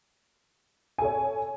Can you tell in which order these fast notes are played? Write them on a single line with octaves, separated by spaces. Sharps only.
G#5 A4 C#5